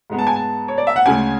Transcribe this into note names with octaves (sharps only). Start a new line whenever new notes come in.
G#2 G#3 B3
A5
G#5
A5
C#5
D5
E5
F#5
D2 C#3 G#3 C#4 G#5